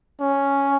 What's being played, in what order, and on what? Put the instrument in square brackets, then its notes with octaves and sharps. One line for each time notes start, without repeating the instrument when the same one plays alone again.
[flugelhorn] C#4